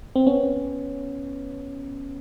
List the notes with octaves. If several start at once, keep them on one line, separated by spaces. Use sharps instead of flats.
C4
B3 C#4